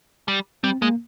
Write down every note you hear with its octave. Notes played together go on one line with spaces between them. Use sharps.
G3
G3 C4
G#3 A#3